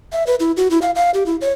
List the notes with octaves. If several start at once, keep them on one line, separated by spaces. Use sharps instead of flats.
E5
B4
E4
F#4
E4
F5
F5
G4
E4
C#5